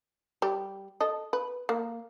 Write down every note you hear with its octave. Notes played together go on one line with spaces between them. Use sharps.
G3 G4
A4 D#5
B4
A#3